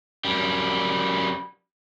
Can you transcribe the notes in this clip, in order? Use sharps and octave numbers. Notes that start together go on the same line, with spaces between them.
F#2 G3